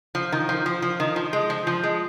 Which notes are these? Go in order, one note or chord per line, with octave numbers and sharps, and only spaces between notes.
F3
D#3
F3
F3
F3
D#3
F3
G#3
F3
F3
G#3